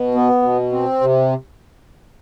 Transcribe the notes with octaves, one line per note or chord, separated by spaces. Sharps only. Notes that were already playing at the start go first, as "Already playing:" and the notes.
Already playing: B2
B3
B2
C4
C3